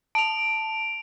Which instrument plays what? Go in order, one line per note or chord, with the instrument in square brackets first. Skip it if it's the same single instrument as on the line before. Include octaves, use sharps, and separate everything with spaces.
[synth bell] A5 [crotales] D7 F7